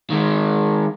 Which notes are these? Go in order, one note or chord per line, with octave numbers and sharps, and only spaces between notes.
D#3 G#3